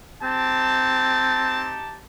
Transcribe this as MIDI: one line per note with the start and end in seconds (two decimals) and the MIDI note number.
0.23 1.76 60
0.23 2.01 63
0.23 2.01 67
0.23 2.01 81